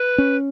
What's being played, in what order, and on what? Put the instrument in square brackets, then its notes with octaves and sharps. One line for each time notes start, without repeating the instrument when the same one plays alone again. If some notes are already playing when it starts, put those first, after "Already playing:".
Already playing: [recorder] B4
[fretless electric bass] C#4